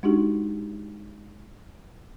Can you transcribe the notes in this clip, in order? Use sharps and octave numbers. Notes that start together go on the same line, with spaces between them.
G#3 D4 D#4 F#4 G4